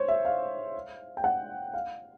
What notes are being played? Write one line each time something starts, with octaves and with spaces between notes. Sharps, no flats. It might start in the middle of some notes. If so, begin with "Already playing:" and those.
Already playing: C5 C#5
E5
F5
G5
F#5
F5